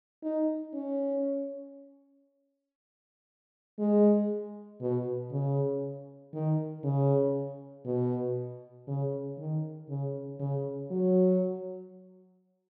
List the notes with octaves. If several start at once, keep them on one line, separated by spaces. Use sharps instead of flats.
D#4
C#4
G#3
B2
C#3
D#3
C#3
B2
C#3
D#3
C#3
C#3
F#3